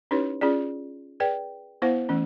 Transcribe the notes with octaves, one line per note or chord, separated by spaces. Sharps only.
C#4 D#4 E4 G4 B4 C#5
C#4 F4 G#4 D5
G#4 B4 D5 G5
B3 E4 C5 F5 F#5
E3 A3 C#4